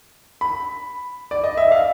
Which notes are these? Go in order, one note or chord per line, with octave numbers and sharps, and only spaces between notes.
B5
D5
D#5
E5
F5